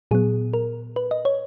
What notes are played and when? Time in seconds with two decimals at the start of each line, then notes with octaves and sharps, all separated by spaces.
0.11 A#2 F#3 B3 G#4
0.54 A#4
0.96 B4
1.11 D#5
1.25 C#5